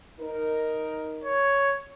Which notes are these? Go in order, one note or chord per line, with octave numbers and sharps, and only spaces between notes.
D#4 A#4
C#5